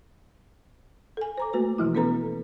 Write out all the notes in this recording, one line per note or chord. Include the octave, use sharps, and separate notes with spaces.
A4 G#5
C5 A#5 D6
A3 A#3 F#4 B4
B2 E3 F3 E4
B3 C#4 A4 B4 A#5